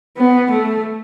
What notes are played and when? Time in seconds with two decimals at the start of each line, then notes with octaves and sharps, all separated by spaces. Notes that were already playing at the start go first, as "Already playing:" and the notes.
0.18 B3
0.51 A3